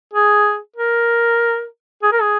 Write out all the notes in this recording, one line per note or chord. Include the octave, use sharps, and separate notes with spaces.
G#4
A#4
G#4
A#4
G#4